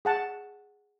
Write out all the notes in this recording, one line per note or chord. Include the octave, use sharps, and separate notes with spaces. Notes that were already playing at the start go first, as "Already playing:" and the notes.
G#4 F#5 A5